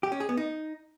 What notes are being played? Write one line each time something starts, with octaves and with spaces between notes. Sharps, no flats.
G4
C#4
G#4
B3
D#4